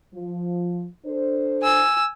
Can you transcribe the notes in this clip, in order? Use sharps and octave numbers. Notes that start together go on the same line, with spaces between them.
F3
D4 A4 C5
G#5 E6